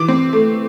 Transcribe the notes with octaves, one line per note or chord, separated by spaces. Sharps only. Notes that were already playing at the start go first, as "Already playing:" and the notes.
Already playing: E3 D6
C4
A3